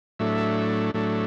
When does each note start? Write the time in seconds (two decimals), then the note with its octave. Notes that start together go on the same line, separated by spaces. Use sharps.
0.19 A2 F#3 A3 D4 E5
0.94 A2 F#3 A3 D4